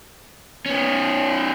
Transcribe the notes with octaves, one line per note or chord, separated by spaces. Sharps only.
B3 C#4